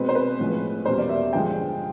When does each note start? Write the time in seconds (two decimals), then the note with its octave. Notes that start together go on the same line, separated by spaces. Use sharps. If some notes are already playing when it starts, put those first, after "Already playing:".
Already playing: B2 G#3 C4 B4
0.09 C5
0.15 B4
0.39 A2 F3 G#3 C#4
0.85 E2 B2 G3 A#3 C#4 C5
0.98 D5
1.09 E5
1.33 G2 D3 F3 G#3 G5